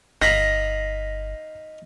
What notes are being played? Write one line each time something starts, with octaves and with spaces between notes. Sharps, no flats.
G1 D#4 F5 B5 A#6